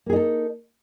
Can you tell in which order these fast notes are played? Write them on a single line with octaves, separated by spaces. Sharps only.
A#3 G#4 D#4 A4